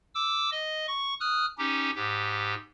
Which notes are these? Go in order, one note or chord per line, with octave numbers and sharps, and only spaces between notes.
D6 E6
D#5
C#6
D#6 F6 F#6
C#4 D#4 G4
G#2 G4